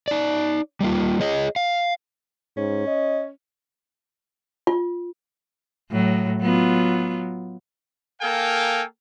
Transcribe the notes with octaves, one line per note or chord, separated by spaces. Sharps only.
D#4 D5
G3 A#3 F4
G#4 C#5 D#5
F5
G#2 C#4
D#5
F4
A2 F#3
F#3 B3 F4
A#3 A4 A#4 F5 G5 G#5